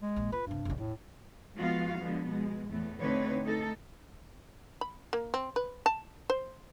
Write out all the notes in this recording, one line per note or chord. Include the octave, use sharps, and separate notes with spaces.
G#3
A#1
F4 B4
B1 G2 C3
F1 A#1
E1 A2
F3 G#3 B3 F4 F#4 F5
D3 F3 G#3 B3
B2 G#3
E2 A2 A3 B3
D3 A3 C4 D#4 B4 C#5
A3 D#4 A4
B5
A#3
C4
B4
A5
C5